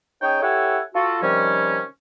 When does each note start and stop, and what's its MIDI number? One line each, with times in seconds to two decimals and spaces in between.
0.22 0.38 61
0.22 0.38 63
0.22 0.38 68
0.22 0.38 73
0.22 0.38 79
0.42 0.80 64
0.42 0.80 67
0.42 0.80 69
0.42 0.80 73
0.42 0.80 78
0.42 0.80 80
0.95 1.22 65
0.95 1.22 66
0.95 1.22 69
1.22 1.82 48
1.22 1.82 51
1.22 1.82 53
1.22 1.82 55
1.22 1.82 61